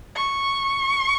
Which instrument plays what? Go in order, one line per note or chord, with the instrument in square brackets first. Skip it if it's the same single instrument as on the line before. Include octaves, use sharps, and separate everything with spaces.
[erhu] C#6